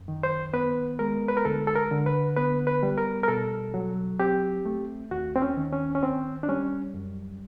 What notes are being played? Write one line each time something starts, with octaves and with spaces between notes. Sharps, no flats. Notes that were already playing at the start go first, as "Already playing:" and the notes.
Already playing: F#2
D#3
C5
B3 B4
G#3 A#4
B4
A#4
D2 A4
A4
A#4
D3
B4
B3 B4
B4
G3
A#4
A#4
B2 A4
F#3
C4 G4
A3
D#2 F#4
C4
C#4
D#3
C#4
C#4
C4
D4
G3 C#4
F#2